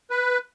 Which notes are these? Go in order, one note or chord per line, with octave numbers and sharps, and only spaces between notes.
B4